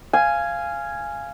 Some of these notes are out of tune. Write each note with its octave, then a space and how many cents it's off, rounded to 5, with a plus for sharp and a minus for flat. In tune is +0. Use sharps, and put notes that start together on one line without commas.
F5 -15 G#5 +0